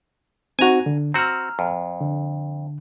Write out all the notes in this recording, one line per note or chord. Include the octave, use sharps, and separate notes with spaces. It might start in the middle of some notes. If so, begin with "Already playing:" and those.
C4 D#4 F#4 G#5 A#5
D3
C4 F#4 A#5 E6 F6
F2
D3